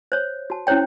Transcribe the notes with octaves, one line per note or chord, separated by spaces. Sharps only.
C5 C#5
F#4 A5
C#4 E4 C5 C#5 G5